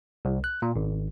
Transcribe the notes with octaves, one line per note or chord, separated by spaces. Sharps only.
C2
F#6
A#2
G#1